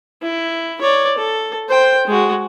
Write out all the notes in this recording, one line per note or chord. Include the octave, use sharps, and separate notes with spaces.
E4
C#5 D5
A4
C5 G5
G#3 F#4